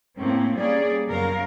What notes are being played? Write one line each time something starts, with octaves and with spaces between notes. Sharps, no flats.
A2 A#3 C4 C#4
G3 A#3 C#4 G#4 D5
F#2 C#3 B3 C#4 A#4 F5